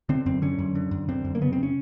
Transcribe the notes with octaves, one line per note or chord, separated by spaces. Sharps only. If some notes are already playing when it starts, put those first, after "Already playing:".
D3 C4
F#2 C4
D3 C#4
F#2
D3
F#2
D3 C4
F#2
A#3
C#3 B3
C4
C#4